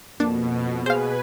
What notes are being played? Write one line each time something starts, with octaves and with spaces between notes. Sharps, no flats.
F2 B2 A#3 D4
G#4 B4 C5 F5 G#5